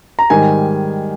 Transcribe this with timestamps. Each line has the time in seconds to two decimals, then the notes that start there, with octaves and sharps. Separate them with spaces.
0.19 A#5
0.30 G#2 D#3 G3 G#5